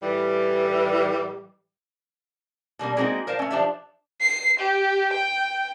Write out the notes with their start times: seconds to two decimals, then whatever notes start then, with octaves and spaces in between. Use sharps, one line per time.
0.03 A2 E3 G3
2.79 B2 G3 A#3 D4
2.97 G#3 A#3 C4 D#4 F#4 A#4
3.27 A#4 C5 D5 F5 A5
3.39 A3 C#4
3.51 F3 D4 G4 C5 D5 E5
4.21 C7
4.60 G4
5.14 G5